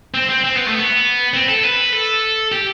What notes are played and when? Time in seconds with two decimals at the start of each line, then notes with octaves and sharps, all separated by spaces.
0.14 C4
0.29 C4
0.44 C4
0.56 B3
0.67 A3
0.79 B3
1.34 C4
1.48 A4
1.63 B4
1.93 A4
2.52 G4